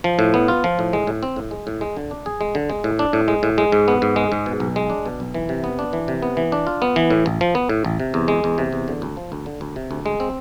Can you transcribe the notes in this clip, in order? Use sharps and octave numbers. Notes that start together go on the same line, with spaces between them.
F3
A2
B3
F4
F3
A2
G#3
A2
C4
A2
G#3
A2
G#3
D3
D4
G#4
G#3
D3
G#3
A2
D4
A2
G#3
A2
G#3
G#2
B3
G#2
G#3
G#2
B2
B1
G#3
D4
B2
B1
E3
C3
B3
D4
E3
C3
B3
E3
D4
F4
B3
E3
A2
A1
F3
B3
A2
A1
C3
E2
G#3
E2
C3
E2
D3
D2
F3
D2
D3
D2
C3
D2
G#3
C4